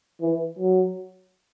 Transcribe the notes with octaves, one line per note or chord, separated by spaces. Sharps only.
E3
F#3